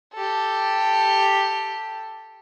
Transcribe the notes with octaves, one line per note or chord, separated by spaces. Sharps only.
G4 A4